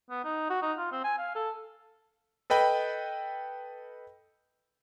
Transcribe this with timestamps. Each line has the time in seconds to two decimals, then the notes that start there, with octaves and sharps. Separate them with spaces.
0.11 B3
0.24 D#4
0.50 F#4
0.62 D#4
0.78 F4
0.92 C4
1.04 G#5
1.18 F5
1.35 A4
2.50 A4 B4 D#5 G5 B5